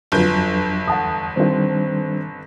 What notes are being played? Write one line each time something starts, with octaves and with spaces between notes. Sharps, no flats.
G1 F2 F#3 D4 F4 B4 G6
E2 F#5 A5 D#6
D#3 G3 C4 D4 C5